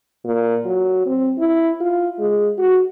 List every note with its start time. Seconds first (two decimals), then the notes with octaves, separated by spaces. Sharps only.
0.25 A#2
0.65 F#3
1.06 C4
1.38 E4
1.80 F4
2.19 G#3
2.58 F#4